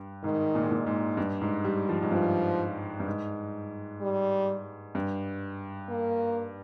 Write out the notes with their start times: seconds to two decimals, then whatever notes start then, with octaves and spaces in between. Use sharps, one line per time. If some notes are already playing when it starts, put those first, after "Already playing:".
Already playing: G2
0.23 G#2 D#3
0.55 A#2
0.63 G#2
0.71 A#2
0.87 G#2
1.17 G2
1.41 G#2
1.64 G3
1.89 F3
2.02 G#2
2.11 G2 F3
3.00 G2
3.07 G#2
4.01 G3
4.95 G2
5.89 A#3